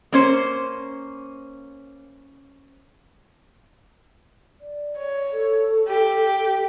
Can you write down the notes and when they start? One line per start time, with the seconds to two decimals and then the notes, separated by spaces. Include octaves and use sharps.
0.12 A#3 C#4 C5
4.61 D5
4.98 C#5
5.33 A4
5.88 G4